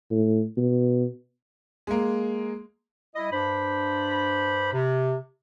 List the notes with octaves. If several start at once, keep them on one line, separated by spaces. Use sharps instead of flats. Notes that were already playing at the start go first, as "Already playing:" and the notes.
A2
B2
G#3 A#3
G3 E4 D#5
G2 D4 C5 B5
C3